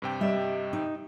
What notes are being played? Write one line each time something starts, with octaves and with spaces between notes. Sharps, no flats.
G2 C3 G5
G3 G4 D#5 E5
D#4